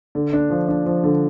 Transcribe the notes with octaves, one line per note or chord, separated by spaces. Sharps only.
D3
D4
F3
D4
F3
D3